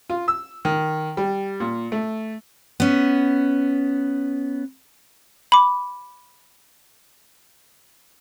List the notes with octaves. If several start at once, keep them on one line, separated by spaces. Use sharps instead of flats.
F4
E6
D#3
G3
A#2
A3
B3 C#4
B5 D6